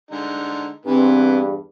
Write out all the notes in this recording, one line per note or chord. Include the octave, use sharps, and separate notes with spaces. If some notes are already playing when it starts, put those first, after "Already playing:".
D3 G#3 D#4
E2 G2 E3 B3 C4